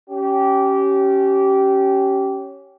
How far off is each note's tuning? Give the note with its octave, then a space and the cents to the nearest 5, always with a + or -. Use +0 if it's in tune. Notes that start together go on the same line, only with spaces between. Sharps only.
C#4 +0 G4 -20